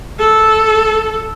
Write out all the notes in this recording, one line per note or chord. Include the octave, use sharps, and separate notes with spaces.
A4